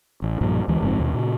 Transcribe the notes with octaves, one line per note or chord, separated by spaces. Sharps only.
A1
B1 G2 A#2 F3
D2 E3 G#3
F#1 G#2 F3 C4
D#2 B2
A#2 C#3